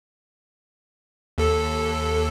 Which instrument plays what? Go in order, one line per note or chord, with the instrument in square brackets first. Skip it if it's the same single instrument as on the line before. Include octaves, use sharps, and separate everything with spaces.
[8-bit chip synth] D#2 A4